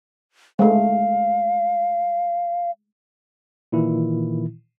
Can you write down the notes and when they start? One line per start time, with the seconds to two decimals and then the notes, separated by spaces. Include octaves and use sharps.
0.59 G#3 A3 F5
3.72 A#2 D#3 E3 E4